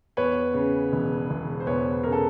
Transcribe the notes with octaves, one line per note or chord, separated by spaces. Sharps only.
E2 B4 C#5
C#3
E1
E1
C5
E2 B4 C#5
C#3 A#4
A4